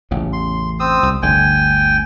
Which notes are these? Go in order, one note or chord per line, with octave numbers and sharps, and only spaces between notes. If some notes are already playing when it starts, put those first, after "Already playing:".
A1 E2 C#3
C6
C4 D#6 E6
C2
G1 D2 D3 G5 G#5